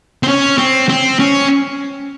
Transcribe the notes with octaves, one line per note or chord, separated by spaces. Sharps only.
C4
C#4
C4
C4
C#4